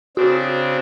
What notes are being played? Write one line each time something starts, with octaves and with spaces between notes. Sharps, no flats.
C#3 C4 D4 F#4